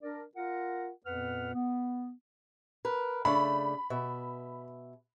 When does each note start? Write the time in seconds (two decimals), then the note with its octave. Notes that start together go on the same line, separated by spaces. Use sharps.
0.03 D4 A#4 D5
0.36 F4 A#4 F#5
1.06 F2 A#2 B3 B4 F#5 F6
1.54 B3
2.85 A#4 B4
3.25 C#3 A3 D4 B5
3.90 B2 E5